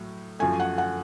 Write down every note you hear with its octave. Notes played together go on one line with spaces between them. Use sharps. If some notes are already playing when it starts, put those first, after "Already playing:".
Already playing: A2 F#3
F#2 F3 A3 G#5
F#5
F#5